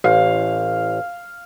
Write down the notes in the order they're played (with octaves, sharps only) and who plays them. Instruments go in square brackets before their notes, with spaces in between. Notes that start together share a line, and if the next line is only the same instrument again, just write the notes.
[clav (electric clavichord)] A1 [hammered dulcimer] F5